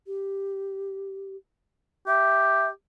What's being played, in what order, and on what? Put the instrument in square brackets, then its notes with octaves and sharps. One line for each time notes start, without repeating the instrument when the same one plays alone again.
[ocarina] G4
[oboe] G4 [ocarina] E5